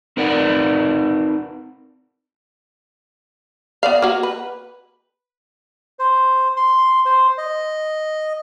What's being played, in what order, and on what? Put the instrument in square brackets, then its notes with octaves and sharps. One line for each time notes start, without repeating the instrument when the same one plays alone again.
[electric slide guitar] C4 D#4 A#4 B4 D5 F#5
[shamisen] B3 D5 F5
A#3 F#4
B4
[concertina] C5
C6
C5
D#5